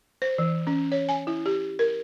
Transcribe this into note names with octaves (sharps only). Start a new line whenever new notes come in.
C5
E3
C#4
C#5
G#5
E4
G4
A#4